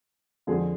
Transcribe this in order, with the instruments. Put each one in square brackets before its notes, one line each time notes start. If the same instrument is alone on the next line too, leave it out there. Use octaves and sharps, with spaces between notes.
[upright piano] F2 D3 F3 G#4